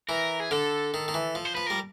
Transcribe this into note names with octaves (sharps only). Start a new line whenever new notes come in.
E3 A#4
G#4
D3 A4
D#3
D#3
E3
F3
C5
F3 B4
G3 A#4